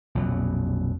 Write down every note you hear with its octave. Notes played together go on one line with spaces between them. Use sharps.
A#1 F2 B2 F#3